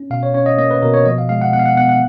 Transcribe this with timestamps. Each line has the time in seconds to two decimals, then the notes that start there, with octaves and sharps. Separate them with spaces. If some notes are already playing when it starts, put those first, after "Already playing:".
Already playing: C#4
0.10 B2 F5
0.23 C#5
0.34 C#4 C#5
0.46 D#5
0.58 A#3 D#5
0.71 B4
0.82 B2 A#4
0.94 C#5
1.05 F3 D#5
1.18 F5
1.29 G#3 F5
1.42 F#5
1.53 B3 F#5
1.59 F5
1.66 F#5
1.77 B3 F#5
1.89 F#5